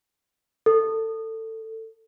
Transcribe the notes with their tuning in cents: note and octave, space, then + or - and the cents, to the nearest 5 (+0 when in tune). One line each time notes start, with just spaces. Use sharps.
A4 +20